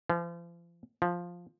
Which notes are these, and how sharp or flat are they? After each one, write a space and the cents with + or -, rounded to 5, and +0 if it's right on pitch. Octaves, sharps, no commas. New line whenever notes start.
F3 -40
F3 +5